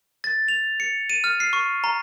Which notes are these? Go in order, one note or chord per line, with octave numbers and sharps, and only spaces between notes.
A6
F7
C#7
D#7
F6
C7
C#6
A#5